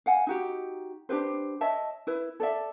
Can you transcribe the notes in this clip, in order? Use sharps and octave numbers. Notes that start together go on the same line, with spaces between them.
F5 F#5 G#5
D#4 F#4 G4
D4 G4 B4 C5
C#5 D#5 E5 A5
E4 B4
A4 D5 E5